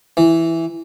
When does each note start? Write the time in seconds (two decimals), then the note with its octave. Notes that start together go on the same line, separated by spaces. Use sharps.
0.17 E3